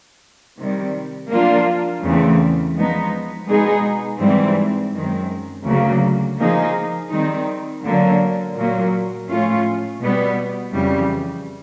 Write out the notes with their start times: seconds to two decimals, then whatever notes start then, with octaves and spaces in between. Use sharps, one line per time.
0.58 C3 D#3 G3
1.31 F3 A#3 D4 F4
2.03 E2 C#3 E3 A3 C4
2.76 F3 G#3 B3 D#4
3.48 B2 G#3 B3 D#4 G#4
4.21 G#2 E3 G3 C4
4.94 F#2 D#3 G#3 C4
5.65 D2 C#3 F#3 A#3
6.39 F3 A#3 D#4 G#4
7.11 D#3 G3 C4 D#4
7.83 D3 F#3 A#3
8.56 A#2 F#3 A#3
9.29 A2 F3 A3 C#4 F4
10.01 B2 G3 B3
10.74 F2 C#3 E3 G3